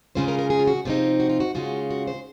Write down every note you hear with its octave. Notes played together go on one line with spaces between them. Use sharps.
C#3 G#3 C#4 F4 C5
A#4
A#4
G#4
F4
F#4
C3 F3 C4 D#4 F4
F#4
F4
F#4
C#3 G#3 C#4 F4 F#4
F#4
C5